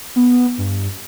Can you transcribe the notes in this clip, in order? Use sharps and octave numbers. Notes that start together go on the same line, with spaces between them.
B3
G2